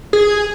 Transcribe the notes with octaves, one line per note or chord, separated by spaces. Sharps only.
G#4